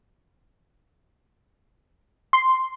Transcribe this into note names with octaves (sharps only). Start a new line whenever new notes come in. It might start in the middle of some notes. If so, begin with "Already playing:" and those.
C6